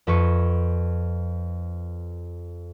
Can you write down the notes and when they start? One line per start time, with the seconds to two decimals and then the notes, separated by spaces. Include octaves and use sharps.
0.07 F2 B4 C#6